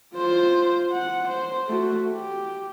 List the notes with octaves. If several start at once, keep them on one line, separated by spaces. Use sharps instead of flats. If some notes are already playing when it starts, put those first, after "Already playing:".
F4 C5
F#5
C5
A3 F#4
G4